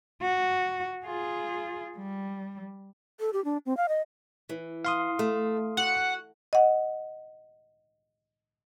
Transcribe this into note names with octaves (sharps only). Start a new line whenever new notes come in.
F#4
F4 G#4
G3
A4
G4
D4
C4
F5
D#5
E3
F5 C6 D#6
A3
F#4 F#5
D#5 F#5